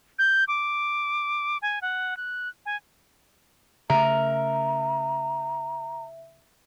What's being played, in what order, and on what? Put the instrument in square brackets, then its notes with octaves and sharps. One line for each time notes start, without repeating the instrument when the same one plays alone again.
[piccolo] G6
D6
G#5
F#5
F#6
G#5
[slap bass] C#3 A3 [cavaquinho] A#4 [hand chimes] E5 [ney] A#5